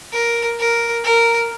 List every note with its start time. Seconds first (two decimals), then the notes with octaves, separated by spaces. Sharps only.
0.13 A#4
0.59 A#4
1.04 A#4